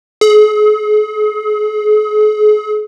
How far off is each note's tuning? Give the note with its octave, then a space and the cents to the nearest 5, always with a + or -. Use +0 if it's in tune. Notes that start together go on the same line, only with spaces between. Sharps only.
G#4 +40